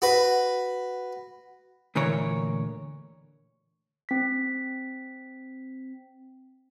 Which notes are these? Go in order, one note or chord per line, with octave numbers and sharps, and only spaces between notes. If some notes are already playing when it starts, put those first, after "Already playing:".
F#4 B4
D2 A#2 E3 A#4 C#5
C4 B6